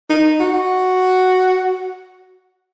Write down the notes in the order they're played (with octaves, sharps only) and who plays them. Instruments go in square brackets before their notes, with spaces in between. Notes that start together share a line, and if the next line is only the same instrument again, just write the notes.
[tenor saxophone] D#4
F#4